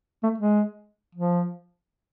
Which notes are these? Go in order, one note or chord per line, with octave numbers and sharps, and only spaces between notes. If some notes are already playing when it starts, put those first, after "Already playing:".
A3
G#3
F3